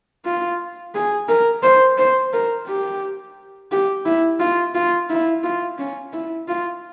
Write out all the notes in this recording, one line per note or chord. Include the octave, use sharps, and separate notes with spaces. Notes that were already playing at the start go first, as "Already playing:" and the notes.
F4
G#4
A#4
C5
C5
A#4
G4
G4
E4
F4
F4
E4
F4
C#4
E4
F4